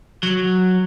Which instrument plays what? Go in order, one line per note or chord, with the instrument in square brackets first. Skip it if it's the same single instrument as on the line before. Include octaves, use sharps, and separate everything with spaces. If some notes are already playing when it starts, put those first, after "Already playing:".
[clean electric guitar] F#3